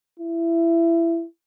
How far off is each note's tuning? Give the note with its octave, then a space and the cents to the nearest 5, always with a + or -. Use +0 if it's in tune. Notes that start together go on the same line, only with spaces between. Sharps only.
E4 +20